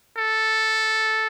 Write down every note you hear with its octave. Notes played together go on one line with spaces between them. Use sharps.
A4